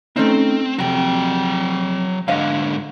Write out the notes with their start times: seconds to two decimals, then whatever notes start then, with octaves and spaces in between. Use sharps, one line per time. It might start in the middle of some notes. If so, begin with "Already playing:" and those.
0.16 A3 C4 C#4 D#4
0.78 F2 C3 F#3 G5
2.28 G#2 D3 C#5 D#5 F5